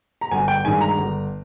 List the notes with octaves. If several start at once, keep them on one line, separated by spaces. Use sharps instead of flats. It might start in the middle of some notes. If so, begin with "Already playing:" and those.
A#5
G1 G#5
G5
G2 D#3 G#3 G#5
A#5
G1